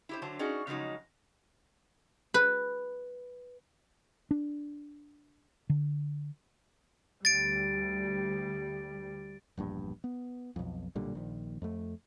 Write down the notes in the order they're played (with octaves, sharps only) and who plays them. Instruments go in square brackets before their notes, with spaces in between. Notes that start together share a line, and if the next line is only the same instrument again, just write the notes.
[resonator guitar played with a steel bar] E4 G4 C5
D3 F#3 C5 A5
C#4 D#4 F#4 G#4 D5
C#3 F3 F#3 G#3 D#4
[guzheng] B4
[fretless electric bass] D4
D3
[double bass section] D2 G3 [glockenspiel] A6 D7
[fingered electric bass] E1 A#1 G2
B3
B1 F2
B1 A#2 D3 G3
A#1 D#3
F2 A3